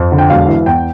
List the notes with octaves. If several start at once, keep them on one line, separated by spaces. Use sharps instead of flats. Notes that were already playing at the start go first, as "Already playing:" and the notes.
Already playing: F2
D3
G5
E1 F5
E3
E2 G5